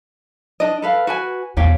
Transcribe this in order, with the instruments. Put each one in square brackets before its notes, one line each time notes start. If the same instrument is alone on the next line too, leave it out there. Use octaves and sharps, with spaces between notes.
[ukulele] D4 D#5
A4 B4 F5
F#4 B4 G#5
[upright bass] B1 E2 [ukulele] G4 C#5 F5